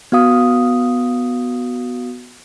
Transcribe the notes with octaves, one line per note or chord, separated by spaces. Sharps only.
B3 F#4 F5 D#6